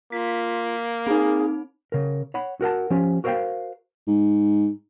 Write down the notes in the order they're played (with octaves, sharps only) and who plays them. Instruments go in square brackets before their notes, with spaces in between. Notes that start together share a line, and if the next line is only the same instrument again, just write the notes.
[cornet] A#3 [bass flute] F4 [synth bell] B6
[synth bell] C4 D#4 [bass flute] G#4
[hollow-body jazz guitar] C#3 A#4
C#5 F#5 B5
F#4 A#4 F#5 A5
F3 C#4 G4
F#4 A#4 C5 E5 F5 G5
[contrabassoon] G#2